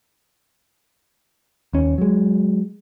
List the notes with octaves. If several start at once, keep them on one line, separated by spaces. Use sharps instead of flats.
D#2 C#4
F#3 G#3